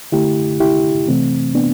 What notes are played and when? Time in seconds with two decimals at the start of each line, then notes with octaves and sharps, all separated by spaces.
0.12 D3 A3 E4 G4
0.60 E4 G4
1.08 C3 E3 A3 C4
1.55 B3 D4